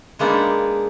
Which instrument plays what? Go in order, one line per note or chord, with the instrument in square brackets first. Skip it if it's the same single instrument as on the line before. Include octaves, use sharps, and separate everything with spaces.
[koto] G#3 A#3 B3 D4 D#4